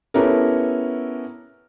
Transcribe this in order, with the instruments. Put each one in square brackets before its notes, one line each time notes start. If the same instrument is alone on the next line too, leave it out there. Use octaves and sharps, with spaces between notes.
[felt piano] B3 C#4 E4 G4 A4 A#4